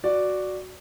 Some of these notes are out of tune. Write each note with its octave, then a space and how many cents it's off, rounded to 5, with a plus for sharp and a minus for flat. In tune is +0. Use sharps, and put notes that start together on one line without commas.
F#4 +0 D5 +0